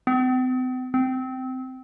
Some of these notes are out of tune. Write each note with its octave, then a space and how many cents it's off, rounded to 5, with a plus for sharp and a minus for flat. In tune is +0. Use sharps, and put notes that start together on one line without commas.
C4 -45
C4 -20